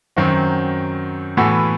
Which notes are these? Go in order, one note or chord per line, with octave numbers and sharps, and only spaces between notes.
F#2 D#3 F#3 C4 F#4
A2 E3 B3 F#4 A4